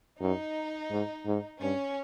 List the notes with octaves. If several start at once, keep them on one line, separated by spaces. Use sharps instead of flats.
F#2 D#4
G#2
G#2
G2 C#4